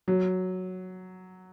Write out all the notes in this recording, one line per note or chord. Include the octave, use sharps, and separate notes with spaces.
F#3